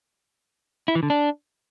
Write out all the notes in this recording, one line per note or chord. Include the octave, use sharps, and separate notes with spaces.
E4
E3
D3
D4